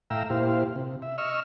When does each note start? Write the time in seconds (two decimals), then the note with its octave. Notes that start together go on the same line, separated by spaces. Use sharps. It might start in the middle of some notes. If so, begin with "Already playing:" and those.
0.10 A2 E5 F5 G5 A#5 E6
0.30 A#2 E4 G4 C5 F5
0.76 C3
1.02 E5
1.18 D#5 C#6 E6 F6